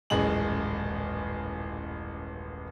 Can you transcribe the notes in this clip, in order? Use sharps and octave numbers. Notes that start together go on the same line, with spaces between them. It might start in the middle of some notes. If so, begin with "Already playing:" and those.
D#1 A1 F#2 G#3 G#4 F#7